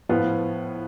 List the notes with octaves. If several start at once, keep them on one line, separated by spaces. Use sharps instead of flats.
A2 F3 B3 F4